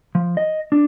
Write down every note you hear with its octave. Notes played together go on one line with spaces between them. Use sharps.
F3
D#5
D4